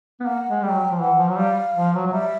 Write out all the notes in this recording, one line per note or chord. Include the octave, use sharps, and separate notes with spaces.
B3
A#3 F#5
G#3
G3 G5
F#3
F3
E3 F#5
F3
F#3
G3 F5
F3
F#3
F#3
G3 E5